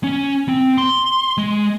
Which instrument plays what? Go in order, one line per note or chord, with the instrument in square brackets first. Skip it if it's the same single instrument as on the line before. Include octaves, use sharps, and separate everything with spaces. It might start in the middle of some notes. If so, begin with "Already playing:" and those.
[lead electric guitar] C#4
C4
C6
G#3